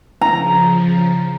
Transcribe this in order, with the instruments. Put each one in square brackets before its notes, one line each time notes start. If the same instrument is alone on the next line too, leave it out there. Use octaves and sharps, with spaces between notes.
[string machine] C#3 F3 [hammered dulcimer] A#5